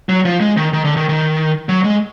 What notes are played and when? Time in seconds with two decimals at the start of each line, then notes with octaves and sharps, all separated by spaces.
0.09 F#3
0.25 F3
0.41 G#3
0.57 D#3
0.73 D#3
0.85 D3
0.96 D#3
1.09 D#3
1.69 F#3
1.84 G#3